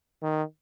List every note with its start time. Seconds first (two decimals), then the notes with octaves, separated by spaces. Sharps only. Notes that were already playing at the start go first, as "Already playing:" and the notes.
0.23 D#3